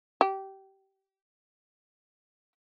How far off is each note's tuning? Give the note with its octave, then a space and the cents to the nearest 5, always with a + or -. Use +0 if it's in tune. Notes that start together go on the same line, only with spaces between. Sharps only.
G4 -20